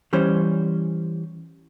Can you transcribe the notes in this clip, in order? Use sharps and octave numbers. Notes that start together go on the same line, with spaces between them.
E3 G3 C#4 C5